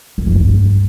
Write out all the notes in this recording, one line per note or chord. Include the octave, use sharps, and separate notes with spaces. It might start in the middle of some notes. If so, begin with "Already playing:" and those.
F#2
F2
G2